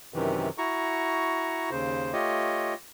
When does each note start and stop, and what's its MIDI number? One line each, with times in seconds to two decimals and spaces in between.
0.14 0.49 42
0.14 0.49 48
0.14 0.49 51
0.14 0.49 52
0.58 1.70 64
0.58 1.70 66
0.58 1.70 82
0.58 1.70 85
1.71 2.13 39
1.71 2.13 49
1.71 2.13 72
2.13 2.74 57
2.13 2.74 65
2.13 2.74 67
2.13 2.74 73
2.13 2.74 75